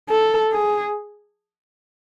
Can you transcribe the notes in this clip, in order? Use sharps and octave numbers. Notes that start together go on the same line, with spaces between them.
A4
G#4